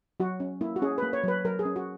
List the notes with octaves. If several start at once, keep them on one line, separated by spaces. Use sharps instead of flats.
F#3 F#4
C#4
A#3 E4
F#4
C#4 G#4
A#3 B4
C#5
F#3 B4
F#3 A#4
G#4
C#4
F#4